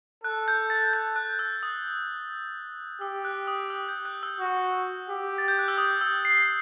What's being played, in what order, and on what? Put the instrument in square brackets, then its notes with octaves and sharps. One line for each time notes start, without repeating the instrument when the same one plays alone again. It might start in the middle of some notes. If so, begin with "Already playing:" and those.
[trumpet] A4 [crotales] F#6
[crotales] G6
A6
G6
F#6
E6
D#6
[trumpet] G4 [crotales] E6
[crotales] F#6
D#6
E6
G6
F#6
E6
[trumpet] F#4
G4
[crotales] A6
G6
F#6
E6
D#6
E6
C7